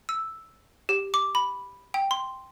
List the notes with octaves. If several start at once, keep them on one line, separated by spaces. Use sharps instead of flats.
E6
G4
D6
B5
G5
C6